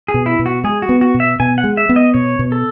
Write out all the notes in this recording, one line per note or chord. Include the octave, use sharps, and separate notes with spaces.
G#4
B2
E4
B2
F#4
G#3 G#4
F#4
B3
F#4
B2
E5
B2 G#5
F#5
G#3
E5
B3
D#5
B2 C#5
B2
A4